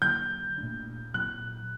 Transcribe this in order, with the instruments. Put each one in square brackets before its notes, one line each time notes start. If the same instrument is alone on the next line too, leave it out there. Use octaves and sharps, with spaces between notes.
[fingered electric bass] D3 F#3 A#3 [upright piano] G6
[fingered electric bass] A#2 A3 D4
[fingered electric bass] A#2 F#3 C4 [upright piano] F#6